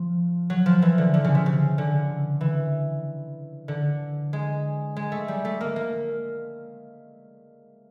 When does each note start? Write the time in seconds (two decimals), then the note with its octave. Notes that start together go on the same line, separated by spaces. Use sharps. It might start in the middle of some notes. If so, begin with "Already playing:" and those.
Already playing: F3
0.50 F#3
0.66 F3
0.82 E3
0.98 D3
1.14 D3
1.24 C#3
1.35 C3
1.46 C#3
1.78 D3
2.41 E3
3.68 D3
4.33 G#3
4.96 G#3
5.12 A3
5.28 G3
5.45 A3
5.61 A#3
5.76 A#3